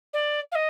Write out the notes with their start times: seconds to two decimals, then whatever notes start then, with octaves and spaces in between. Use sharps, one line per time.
0.13 D5
0.52 F5
0.55 D#5